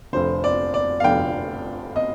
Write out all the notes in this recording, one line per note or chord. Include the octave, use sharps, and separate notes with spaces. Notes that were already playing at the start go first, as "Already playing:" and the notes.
F1 F2 D3 C5
D5
D5
F5
F1 F2 D3 G5
D#5